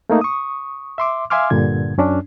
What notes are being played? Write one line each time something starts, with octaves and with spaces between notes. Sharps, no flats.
A3 A#3 D#4
C#6 D#6
E5 C6 D6
E5 F5 G#5 C6 D6 F6
G2 A#2 D3 G#6
F#2 C#4 D4